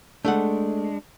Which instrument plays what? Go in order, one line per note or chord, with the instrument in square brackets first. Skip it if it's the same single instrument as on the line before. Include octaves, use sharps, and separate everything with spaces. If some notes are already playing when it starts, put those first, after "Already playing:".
[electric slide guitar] G#3 D4 [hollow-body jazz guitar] A3 A4 F#5